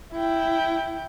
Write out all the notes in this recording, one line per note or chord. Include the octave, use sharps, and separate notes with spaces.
E4 G5